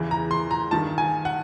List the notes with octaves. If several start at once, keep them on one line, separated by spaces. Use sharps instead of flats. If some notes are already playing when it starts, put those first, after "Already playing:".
Already playing: E2 C#3 E3
A#5
C6
A#5
G2 D#3 A5
G#5
F#5